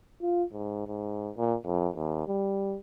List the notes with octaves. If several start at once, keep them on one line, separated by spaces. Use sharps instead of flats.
F4
G#2
G#2
A#2
F2
D#2
G3